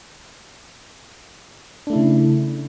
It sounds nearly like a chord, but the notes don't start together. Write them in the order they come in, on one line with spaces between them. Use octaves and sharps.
D4 A3 E4 C#3